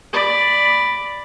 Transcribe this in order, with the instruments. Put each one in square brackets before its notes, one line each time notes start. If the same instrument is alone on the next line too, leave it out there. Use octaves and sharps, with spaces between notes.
[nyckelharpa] D5 B5